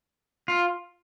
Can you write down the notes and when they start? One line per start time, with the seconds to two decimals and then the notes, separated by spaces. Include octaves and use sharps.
0.48 F4